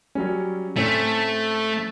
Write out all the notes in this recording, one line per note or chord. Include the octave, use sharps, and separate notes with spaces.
F#3 G3 C#4
A2 A3 C4 C#4